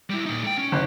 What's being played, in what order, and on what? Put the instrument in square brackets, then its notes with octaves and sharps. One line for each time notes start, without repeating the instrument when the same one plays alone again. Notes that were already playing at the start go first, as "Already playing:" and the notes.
[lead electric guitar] G3 E4
A#2 D#4
A3 G5
C#4
[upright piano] F#1